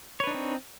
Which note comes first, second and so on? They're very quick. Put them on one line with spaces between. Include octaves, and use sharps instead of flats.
C#5 B4 D4 D#4 C4